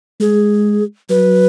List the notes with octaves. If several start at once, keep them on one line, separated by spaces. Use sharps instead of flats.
G#3 G#4
F#3 B4